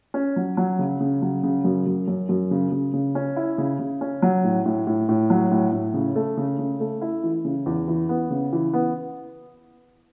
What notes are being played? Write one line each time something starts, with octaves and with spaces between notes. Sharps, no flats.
C#4
F#3
F#3
C#3
C#3
F#3
C#3
F#2
F#2
F#2
F#2
C#3
C#3
C#3
C#4
E4
C#3
C#3
C#4
F#3
A2
A2
A2
A2
F#3
A2
A2
C#3
A3
C#3
C#3
A3
E4
E3
C#3
E2
E3
B3
C#3
E3
B3